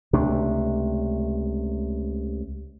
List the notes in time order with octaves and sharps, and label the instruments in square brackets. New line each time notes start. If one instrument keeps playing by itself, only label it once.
[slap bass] C#2 C3 A3 D4